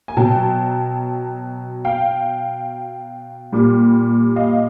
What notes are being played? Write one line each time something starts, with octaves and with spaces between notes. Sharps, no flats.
G#5
B2 F#3 G5 A5
F5 G5
A#2 G3
D#5 F5